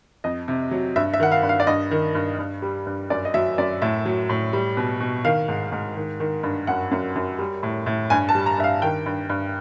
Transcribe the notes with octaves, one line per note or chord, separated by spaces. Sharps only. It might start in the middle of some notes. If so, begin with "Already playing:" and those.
F2 D#5
C3
F#3
G2 E5
E5
D#3 F#5
F5
G2
F5
D5
G2 D#5
D#3
G2
G2
G3
G2
F#2 D5
D#5
F#3 E5
F#2 D5
A2 E5
F#3
A2
G3
B2
B2
D#3 F5
G#2
G#2
D#3
D#3
G2
F#2 F#5
F#2
F#2
G3
A2
A2
G2 G#5
A5
G3
A#5
G2 E5
F5
D#3 G5
G2
G2